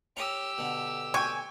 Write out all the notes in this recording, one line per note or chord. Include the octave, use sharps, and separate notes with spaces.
C#4 G4 A#5 E6
B2 D3
G5 G#5 C#6